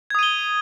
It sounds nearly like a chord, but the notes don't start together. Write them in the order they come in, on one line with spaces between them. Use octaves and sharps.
G#6 D#6 D#7 G7